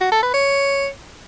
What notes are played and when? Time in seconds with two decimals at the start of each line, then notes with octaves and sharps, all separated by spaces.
0.01 F#4
0.12 A4
0.23 B4
0.34 C#5